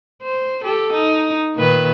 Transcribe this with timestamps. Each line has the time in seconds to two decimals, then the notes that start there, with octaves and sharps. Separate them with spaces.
0.22 C5
0.64 G4 A4
0.94 D#4
1.56 A#2 D#3 B4